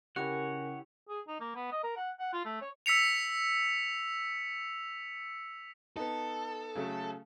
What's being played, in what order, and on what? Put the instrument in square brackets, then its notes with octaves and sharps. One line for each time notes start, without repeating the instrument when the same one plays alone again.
[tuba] C#3 [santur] E4 G4 [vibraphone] A#4 G#5 [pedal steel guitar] C#5 F#5
[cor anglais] G#4
D#4
A#3
B3
D#5
A#4
F#5
F#5
F4
A3
C#5
[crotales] E6 B6 C#7 F7
[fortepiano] B3 D#4 [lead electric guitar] A4
[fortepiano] C#3 F#3 A3